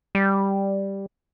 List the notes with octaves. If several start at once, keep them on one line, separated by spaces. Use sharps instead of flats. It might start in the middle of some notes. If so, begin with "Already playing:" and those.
G3